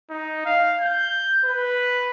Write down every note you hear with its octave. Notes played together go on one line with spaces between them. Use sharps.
D#4
F5
G6
B4